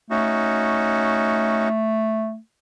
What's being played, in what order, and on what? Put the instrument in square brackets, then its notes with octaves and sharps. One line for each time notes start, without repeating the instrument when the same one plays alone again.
[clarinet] A3 [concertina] C#4 D#4 F#4